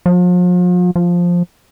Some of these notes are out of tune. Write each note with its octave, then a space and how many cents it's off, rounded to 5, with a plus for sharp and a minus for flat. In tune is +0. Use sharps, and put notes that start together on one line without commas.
F3 +40
F3 +5